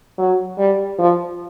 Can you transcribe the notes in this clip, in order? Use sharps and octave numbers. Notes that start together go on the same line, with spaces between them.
F#3
G3
F3